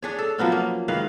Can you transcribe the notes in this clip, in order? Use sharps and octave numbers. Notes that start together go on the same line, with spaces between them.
D4 G#4 C#5
A4
F3 F#3 B3 C#4
A#3
G#2 D#3 B4 F5